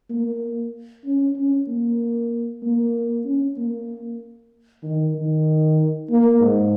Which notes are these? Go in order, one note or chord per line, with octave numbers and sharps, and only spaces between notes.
A#3
C#4
C#4
A#3
A#3
C#4
A#3
D#3
D#3
A#3
G#2